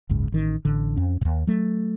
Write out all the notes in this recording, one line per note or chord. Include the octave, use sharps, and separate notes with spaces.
F#1 C#2 G#2
A1 D#3
A1 D3
F2 C#4
D#2 A2
F#3 A3